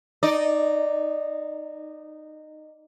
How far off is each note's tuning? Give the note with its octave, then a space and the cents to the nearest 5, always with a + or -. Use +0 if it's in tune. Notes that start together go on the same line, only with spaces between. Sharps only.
D#4 -15 D5 +0